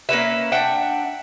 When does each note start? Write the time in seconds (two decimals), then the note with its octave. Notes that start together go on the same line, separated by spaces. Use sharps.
0.09 A#3 C#4 B4 E5
0.52 D4 E5 F#5 G5